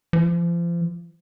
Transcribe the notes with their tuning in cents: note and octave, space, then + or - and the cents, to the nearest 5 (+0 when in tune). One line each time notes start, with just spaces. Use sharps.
F3 -35